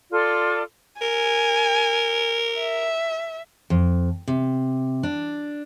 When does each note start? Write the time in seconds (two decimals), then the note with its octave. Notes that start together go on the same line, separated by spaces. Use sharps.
0.12 F4 A4 D5 C6
1.02 A#4 G#5
2.59 E5
3.70 F2
4.28 C3
5.03 D4